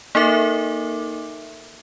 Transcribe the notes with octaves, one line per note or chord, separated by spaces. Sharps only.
A#3 D#4 A4 A#4 E5 D6